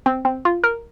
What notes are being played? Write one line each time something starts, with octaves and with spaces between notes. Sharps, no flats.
C4
C4
F4
A#4